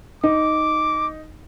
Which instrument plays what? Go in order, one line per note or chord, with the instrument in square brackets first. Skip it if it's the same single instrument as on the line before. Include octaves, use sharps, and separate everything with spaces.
[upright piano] D#4 [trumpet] D6